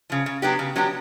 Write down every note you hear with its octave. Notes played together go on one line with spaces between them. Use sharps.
C#3 F3
C#3
F#3 B3 D4 G4
C#3
F#3 B3 D4 G4